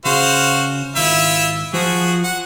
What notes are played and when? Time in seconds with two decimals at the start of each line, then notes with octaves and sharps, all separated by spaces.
0.05 C#3 F#4 C5 F5
0.96 G#1 E4 F4 E5
1.74 F3 F#4 G#4
2.24 F#5